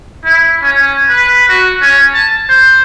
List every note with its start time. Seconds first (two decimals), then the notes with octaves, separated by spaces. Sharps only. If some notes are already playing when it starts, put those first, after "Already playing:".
0.25 E4
0.63 C#4
1.09 B4
1.49 F#4
1.82 C#4
2.14 A5
2.49 C5